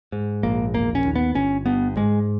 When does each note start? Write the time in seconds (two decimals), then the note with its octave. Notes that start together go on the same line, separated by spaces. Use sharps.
0.12 G#2
0.43 A#1 A#3
0.74 E1 A#3
0.95 C#4
1.05 D#2
1.16 B3
1.35 G1 C#4
1.66 G2 B3
1.97 G#2 G#3